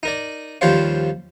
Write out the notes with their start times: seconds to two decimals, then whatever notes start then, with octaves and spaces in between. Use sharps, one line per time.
0.03 D#4 A#4 D5
0.61 D#2 F3 G3 C5 C#5 F5